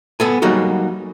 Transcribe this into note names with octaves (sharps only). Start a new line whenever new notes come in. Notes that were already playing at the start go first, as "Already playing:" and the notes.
B3 A4 G#5
F#3 G3 A#3 D#4 F#4 G#4